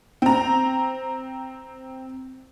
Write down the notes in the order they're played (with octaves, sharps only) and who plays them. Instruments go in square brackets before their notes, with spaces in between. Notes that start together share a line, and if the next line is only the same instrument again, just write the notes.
[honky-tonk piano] C4 A#5